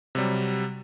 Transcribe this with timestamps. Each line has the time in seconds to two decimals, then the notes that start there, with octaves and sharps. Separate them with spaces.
0.15 C3 F#3 G3